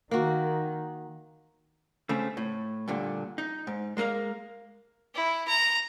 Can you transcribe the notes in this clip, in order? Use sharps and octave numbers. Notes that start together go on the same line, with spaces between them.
D#3 A#3 F#4
C#3 A3 C4
A2
G2 A#2 D3
D#4
G#2
G#3 A#3 D4 A#4 F5
E4
A#5